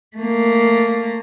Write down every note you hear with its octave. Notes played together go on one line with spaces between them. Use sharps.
A3 A#3